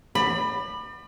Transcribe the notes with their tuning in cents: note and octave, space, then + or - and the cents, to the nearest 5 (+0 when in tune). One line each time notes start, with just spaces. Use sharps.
D5 +40 B5 +0